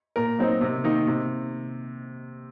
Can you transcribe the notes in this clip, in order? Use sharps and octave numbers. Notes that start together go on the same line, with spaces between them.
A#2 A#4
F#3 C4 D#4
C3
D#3 A#3 D#4
C3